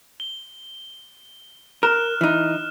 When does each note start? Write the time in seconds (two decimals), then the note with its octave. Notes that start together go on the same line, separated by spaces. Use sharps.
0.20 G7
1.83 A#4 F6 F#6 E7
2.21 E3 D#4